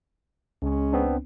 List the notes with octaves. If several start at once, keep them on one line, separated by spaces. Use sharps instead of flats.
C#2 G#3 C#4
B3 C4 D4